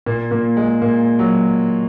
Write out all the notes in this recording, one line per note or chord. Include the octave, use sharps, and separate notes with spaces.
A#2 A#3
A#2 A#3
G#3
A#2 A#3
F#3